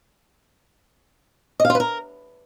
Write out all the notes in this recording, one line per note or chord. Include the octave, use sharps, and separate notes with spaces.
D#5
F5
F4
B4
A#4